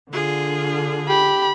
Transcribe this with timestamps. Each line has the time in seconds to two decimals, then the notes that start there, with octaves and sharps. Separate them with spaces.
0.12 D3 F4 G#4
1.09 G4 B5